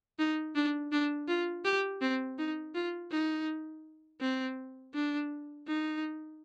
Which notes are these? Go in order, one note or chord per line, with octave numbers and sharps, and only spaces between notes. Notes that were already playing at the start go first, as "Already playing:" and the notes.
D#4
D4
D4
F4
G4
C4
D#4
F4
D#4
C4
D4
D#4